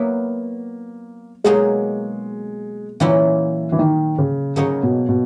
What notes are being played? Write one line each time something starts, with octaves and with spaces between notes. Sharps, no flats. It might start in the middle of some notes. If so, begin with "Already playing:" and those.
Already playing: F#3 A#3 B3 E4
B2 F#3 G#3 A#3 D#4 G#4
A#2 E3 F#3 A#3 C#4 E4
E3
D#3
C#3
C#3 F#3 A#3 D#4 G#4 C#5
B2
B2